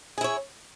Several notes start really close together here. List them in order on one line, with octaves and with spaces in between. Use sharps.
G#4 E4 C#5